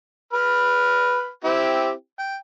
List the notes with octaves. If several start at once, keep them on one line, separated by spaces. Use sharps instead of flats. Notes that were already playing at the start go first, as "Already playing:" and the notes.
B4 B5 F6
C4 E4 G4
G5